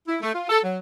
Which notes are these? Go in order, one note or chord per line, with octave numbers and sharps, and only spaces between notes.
E4
A3
F4
A4
F#3